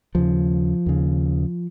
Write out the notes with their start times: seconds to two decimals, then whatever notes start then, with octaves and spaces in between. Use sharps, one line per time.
0.15 D#2 C#3 F3
0.86 D#2 C#3